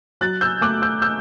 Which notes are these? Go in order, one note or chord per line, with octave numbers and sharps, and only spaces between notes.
F#3 F#6 A6
E6 G6
A3 D6 F#6
E6 G6
E6 G6